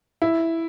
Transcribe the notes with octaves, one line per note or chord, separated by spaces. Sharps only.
E4